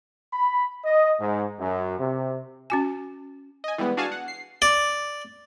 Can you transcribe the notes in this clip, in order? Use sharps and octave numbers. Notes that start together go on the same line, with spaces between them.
B5
D#5
G#2
F#2
C3
C#4 F#4 G#5
D#5 G#5
E3 G3 G#3 B3
D4 F#4 G#4 F5 G#5 A5
F#5
C7
D5